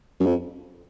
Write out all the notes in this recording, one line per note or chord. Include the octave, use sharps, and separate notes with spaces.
F#2
F2